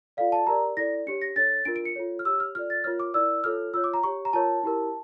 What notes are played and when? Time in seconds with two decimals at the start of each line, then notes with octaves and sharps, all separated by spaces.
0.17 F4 A4 D5 F5
0.32 A5
0.47 G4 A#4 D5 A#5
0.77 E4 A4 D5 A#6
1.07 D4 G4 C#5 C#7
1.22 A#6
1.36 D4 A4 C#5 A6
1.65 D4 F4 A#4 D7
1.76 D7
1.85 C#7
1.96 F4 A4 C#5
2.19 F6
2.25 G4 C#5 E6
2.40 F6
2.55 F4 A4 D5 F6
2.70 A6
2.84 F4 A#4 C#5 F6
3.00 D6
3.14 E4 A#4 D5 E6
3.44 F4 A4 C#5 F6
3.74 F4 C#5 E6
3.84 D6
3.94 A#5
4.03 G4 C#5 C#6
4.25 A#5
4.33 F4 A#4 C#5 A5
4.63 E4 G4 A#4